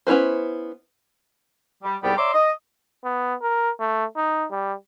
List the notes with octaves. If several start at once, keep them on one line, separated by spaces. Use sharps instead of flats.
B3 C#4 E4 B4 C5
G3
C2 G#2 G3 B3 D5 G5
C#5 D5 E5 A#5 C6 D6
D#5
B3
A#4
A3
D#4
G3